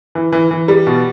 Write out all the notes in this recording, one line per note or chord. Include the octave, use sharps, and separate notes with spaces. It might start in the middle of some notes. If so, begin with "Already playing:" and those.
E3
E3
E3
G3
B2